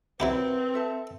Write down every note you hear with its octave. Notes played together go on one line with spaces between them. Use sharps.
F#3 C4 E4 G4 A#4 B4
A4 E5 A5